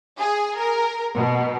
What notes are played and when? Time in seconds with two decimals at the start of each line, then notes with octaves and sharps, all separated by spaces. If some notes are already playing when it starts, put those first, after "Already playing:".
0.19 G#4
0.59 A#4
1.17 B2